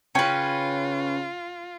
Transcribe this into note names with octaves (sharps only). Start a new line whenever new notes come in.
C#3 C#4 F4 B4 G5